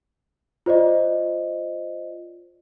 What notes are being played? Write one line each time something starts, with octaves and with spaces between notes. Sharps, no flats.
F4 C5 D5 D#5